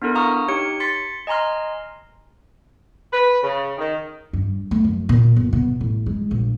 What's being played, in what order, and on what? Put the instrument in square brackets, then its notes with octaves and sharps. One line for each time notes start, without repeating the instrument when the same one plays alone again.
[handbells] B3 D4 E4 A4 A#4
F5 A#5 C#6 D#6 F6
D#4 G4 C#5 C#7
C6 A6 B6 C#7
D#5 G#5 A#5 C6 F6
[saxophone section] B4
C#3
D#3
[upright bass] G2
A3
F#2
A#2
G1
B2
A1
G#3
A#1